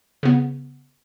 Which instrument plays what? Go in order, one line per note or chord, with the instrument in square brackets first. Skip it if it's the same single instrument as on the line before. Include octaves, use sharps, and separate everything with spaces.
[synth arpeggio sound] C#3 B3